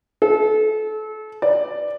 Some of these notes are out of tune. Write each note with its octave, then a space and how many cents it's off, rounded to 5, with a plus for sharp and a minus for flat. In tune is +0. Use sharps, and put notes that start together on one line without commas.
A4 -30
D5 +5